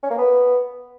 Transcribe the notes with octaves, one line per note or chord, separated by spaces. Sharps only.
C#4
A#3
B3